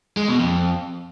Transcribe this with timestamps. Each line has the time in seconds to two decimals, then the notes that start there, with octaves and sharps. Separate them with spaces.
0.17 G#3
0.28 B2
0.39 F2